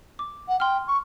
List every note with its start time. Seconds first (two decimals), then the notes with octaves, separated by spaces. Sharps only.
0.19 D6
0.48 F#5
0.60 G5 C6 F6
0.88 C#6